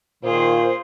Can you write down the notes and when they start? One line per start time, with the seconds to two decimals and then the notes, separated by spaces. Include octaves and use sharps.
0.23 A#2 D#3 F4 G#4 C5